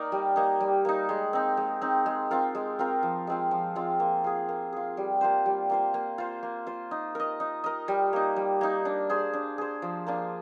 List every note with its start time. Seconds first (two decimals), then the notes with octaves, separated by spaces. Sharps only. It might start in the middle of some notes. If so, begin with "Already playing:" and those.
Already playing: A#3 D#4 A#4 D5
0.12 G3
0.36 A#3 D#4
0.60 G3
0.85 A#3 D#4
1.09 G#3
1.33 C4 D#4
1.57 G#3
1.81 C4 D#4
2.06 G#3
2.31 C4 F4 A#4
2.55 G#3
2.79 C4 F4 A#4
3.03 F3
3.27 G#3 C4 F4
3.51 F3
3.76 G#3 C4 F4
4.00 A#3
4.24 F4 G#4
4.49 A#3
4.73 F4 G#4
4.97 G3
5.21 A#3 F4 C5
5.46 G3
5.70 A#3 F4 C5
5.94 A#3
6.18 F4 C5
6.43 A#3
6.67 F4 C5
6.91 D#4
7.15 A#4 D#5
7.40 D#4
7.64 A#4 D#5
7.88 G3
8.13 A#3 D#4
8.36 G3
8.61 A#3 D#4
8.85 D4
9.10 G#4 C5
9.33 D4
9.58 G#4 C5
9.82 F3
10.07 A#3 D4 F4